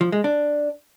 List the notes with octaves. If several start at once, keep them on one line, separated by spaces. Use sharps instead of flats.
F3
G#3
D4